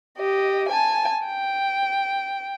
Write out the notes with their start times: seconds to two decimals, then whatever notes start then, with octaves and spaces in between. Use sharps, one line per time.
0.18 G4 D#5
0.69 G#5 A5
1.26 G5